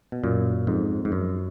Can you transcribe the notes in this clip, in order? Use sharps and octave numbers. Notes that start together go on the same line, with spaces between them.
B2
F#2 A#2
F2 G#2
G#2
F#2